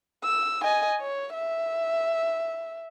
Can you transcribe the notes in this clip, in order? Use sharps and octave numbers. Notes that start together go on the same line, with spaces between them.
E6
D#5 G#5
C#5
E5